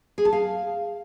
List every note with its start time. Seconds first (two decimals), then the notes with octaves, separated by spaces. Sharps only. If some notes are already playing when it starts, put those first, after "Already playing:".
0.18 G#4
0.25 A5
0.33 F5